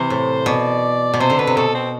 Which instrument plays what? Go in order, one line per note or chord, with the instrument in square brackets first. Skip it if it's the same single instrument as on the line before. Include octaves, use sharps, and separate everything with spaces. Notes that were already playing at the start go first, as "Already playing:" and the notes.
Already playing: [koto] C3 E3 [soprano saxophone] C5
[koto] A2
[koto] B2 [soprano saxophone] D5
[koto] B2
[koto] C3 [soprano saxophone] C5
[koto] D3
[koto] B2 [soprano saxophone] B4
[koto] C3
[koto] B2 [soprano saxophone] A4
[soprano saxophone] C4